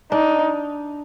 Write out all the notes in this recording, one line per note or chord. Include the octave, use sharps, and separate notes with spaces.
D4 D#4